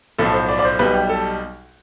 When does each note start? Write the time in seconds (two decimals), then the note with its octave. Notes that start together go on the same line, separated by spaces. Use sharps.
0.18 B1 A2 F3 A4
0.33 C5
0.49 D5
0.59 D5
0.65 C5
0.79 B1 B2 G3 B4
0.94 G4
1.09 A4